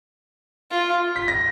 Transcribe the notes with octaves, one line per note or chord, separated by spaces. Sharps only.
F4
B6
A#6